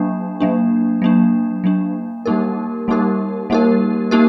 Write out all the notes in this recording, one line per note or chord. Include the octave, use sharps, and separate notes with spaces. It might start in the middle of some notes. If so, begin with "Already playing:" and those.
Already playing: F#3 A#3 D4
F#3 A#3 D4
F#3 A#3 D4
F#3 A#3 D4
G3 A#3 D#4 G4 A#4
G3 A#3 D#4 G4 A#4
G3 A#3 D#4 G4 A#4
A#3 D#4 G4 A#4